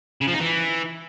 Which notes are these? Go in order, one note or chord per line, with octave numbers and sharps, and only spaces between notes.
C#3
F3
D#4
E3